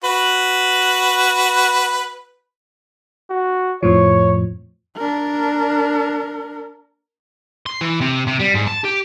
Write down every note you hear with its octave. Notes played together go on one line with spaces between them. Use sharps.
F#4 B4
F#4
F2 A2 F3 C#5
D4 A#4
C6
E3
C3
C3
G3
G#2
A5
G4